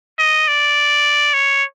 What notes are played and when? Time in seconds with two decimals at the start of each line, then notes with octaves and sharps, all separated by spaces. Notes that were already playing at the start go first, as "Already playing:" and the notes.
0.19 D#5
0.48 D5
1.33 C#5